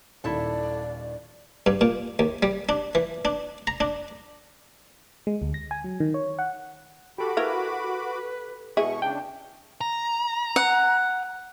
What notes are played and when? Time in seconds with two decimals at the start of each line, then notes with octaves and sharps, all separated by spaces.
0.24 D#1 D#2 E4 A4 D5 A5
1.66 G2
1.81 A#2
2.19 D#2
2.43 G3
2.69 D4
2.95 E3
3.25 D4
3.67 A#5
3.80 D4
5.27 G#3
5.42 D2
5.54 A#6
5.71 G#5
5.84 F#3
6.00 D#3
6.14 C#5
6.39 F#5
7.18 F#4 G4 A4 B5 D6
7.37 E4 A#4 B4 F5
8.77 B2 G#3 E4 G#4 C#6
9.02 C#3 D4 G5
9.81 A#5
10.56 F#5